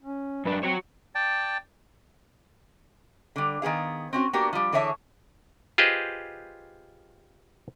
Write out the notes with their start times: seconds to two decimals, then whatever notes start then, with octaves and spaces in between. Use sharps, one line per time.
0.03 C#4
0.45 F#2 D4 B4
0.63 C4 F#4 C#5
1.15 D5 G5 A5
3.36 D3 G3
3.62 D#3 B3 G#4 F5
4.13 C4 C#4 F#4
4.33 A#3 B3 D4 F#4 G4
4.53 F3 G3
4.72 D3 E3 G#4 C#5 E5 A5
5.78 F4 G4 G#4 B4 C5 D#5